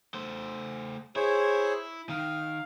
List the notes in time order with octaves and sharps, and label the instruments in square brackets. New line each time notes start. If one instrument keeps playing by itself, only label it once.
[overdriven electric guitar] A3 C5
[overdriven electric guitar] E4 [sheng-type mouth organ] G#4 C5 C#5
[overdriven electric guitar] D#3 [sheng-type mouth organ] F5